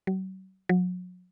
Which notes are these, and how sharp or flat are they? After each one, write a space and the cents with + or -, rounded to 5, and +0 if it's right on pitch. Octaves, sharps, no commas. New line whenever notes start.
F#3 +40
F#3 -35